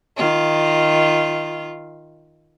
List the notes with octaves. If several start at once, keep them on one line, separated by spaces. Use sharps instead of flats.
D#3 F4